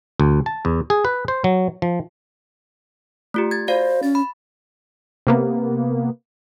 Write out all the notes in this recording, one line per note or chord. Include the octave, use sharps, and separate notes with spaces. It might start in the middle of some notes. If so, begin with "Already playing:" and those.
D2
A5
E2
G#4
B4
C5
F#3
F3
A3 F4 G4
G#6 A6
F#4 C5 D5 F5
C#4 A6
B5
C3 A#3 B3